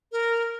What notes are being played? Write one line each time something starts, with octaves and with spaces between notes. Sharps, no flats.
A#4